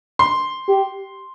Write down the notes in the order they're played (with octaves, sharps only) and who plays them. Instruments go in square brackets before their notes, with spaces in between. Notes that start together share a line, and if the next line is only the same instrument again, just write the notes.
[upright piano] C6
[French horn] G4